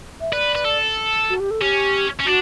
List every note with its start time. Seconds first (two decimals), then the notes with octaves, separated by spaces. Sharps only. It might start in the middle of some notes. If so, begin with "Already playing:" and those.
0.21 E5
0.33 B4 D5
0.55 B4
0.65 A4
1.30 F#4
1.40 G4
1.51 A4
1.61 C#4 G4
2.19 C#4
2.26 D4 F#4